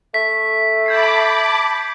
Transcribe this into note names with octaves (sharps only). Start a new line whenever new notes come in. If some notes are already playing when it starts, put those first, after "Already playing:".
A3 B6
A5 B5 D6 G6 G#6 C7